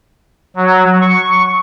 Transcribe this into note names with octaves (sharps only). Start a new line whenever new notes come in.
F#3
C#6